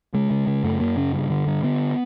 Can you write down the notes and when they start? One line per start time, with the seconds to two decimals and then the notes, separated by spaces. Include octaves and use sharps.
0.14 C#3 G#3
0.31 C#3
0.47 C#3
0.64 F#2 A3
0.80 F#2 A#3
0.97 C#3 C#4
1.14 G2
1.30 D3
1.47 G2
1.63 D3 B3